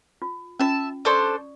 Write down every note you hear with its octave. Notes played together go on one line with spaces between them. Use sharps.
F4
C#4 F4 E5 A5
D4 A4 C5 D5 C#6 D#6